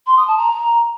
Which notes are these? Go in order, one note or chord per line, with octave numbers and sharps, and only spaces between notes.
C6
D#6
A5
A#5